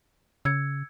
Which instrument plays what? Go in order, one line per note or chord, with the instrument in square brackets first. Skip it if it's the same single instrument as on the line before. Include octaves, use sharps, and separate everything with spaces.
[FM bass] C#3 [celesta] E6 G#6 C#7